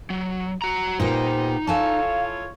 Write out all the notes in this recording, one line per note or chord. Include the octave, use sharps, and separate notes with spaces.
F#3
F#4 A#5
A#2 B3 D#4 G4 C5
E4 F4 A4 C#5 F5 G#5 A5